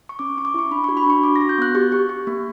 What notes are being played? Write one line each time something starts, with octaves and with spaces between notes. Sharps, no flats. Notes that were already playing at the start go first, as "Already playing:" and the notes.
C#6
C#4 D6
C#4 C#6
D6
E4 C#6
D4 B5
C#6
F#4
B5
D4 C#6
F#4 D6
A#6
F#4
G6
B3 F#6
G4 C#6
G4
G4
A#3